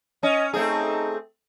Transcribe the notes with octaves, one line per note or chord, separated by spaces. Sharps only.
C#4 D#5
A3 C4 D#4 G#4